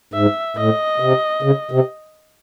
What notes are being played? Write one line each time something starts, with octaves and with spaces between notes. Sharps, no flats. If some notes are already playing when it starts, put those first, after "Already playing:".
G#2 E5
A2 D#5
C3
C#3
C3